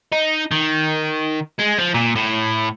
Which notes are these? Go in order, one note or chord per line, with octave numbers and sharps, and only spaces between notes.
D#4
D#3
G#3
F3
A#2
A2